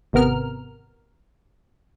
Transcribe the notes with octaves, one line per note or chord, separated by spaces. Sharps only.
G#1 C3 B3 A#4 F6